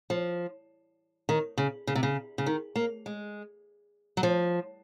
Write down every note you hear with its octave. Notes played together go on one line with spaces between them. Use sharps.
F3
D#3
C#3
C#3
C3
C#3
C#3
D#3
A#3
G#3
F#3
F3